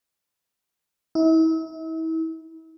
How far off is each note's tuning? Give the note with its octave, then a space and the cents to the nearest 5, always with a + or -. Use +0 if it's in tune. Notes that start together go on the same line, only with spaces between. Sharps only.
E4 -40